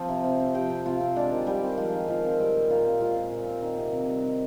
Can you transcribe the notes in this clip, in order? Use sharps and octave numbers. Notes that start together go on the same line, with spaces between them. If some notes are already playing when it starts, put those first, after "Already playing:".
Already playing: F3 C4 C5 F5
C3
C3
C4
F3 G4 G5
C3
C3 F4 F5
C4
G#3 D4 D5
D#3
D#3 G3 G4
C4
F3 G#3 F4
D#3
D#3 F3 F4
C4
G3 G#3 G4
A#2
A#2 F4 F5
C4
G#3 F4 F5
A#2
A#2
C4
D#3
C3
C3
G3
D#3